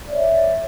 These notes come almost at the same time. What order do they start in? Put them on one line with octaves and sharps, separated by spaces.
D5 E5 C#5